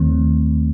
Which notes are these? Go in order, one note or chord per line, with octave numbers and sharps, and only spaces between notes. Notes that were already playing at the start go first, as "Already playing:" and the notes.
Already playing: D#2 D#3 A3 C4